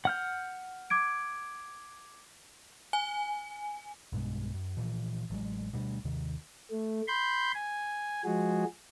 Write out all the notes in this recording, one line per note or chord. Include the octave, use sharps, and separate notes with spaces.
F#5 F6 G6
D6 G#6 D7
G#5
B1 G2 B2 G#3
F#2
A#2 E3 F3
A1 F#3 G#3
D2 B2 G3
D#2 C3 D#3
A3
B5 C6 G6
G#5
F3 G#3 F#4 G#4